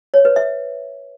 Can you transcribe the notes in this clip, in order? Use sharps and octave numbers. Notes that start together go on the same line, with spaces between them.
C#5
B4
E5